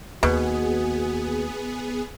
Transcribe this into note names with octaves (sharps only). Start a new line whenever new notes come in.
D#2 B2 B3 F#4 G#4